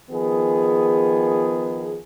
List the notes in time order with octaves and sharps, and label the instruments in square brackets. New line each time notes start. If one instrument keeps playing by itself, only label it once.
[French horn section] D#3 F3 B3 G#4